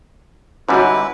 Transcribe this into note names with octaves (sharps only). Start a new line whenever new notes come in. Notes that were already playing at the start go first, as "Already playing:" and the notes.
G#2 D3 G3 C#4 E4 F#4 B4